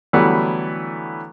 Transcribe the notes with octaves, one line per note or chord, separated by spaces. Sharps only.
D3 E3 F#3 G3 A3 B3